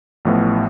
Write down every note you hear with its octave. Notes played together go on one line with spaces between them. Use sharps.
A1 A2 F3 B3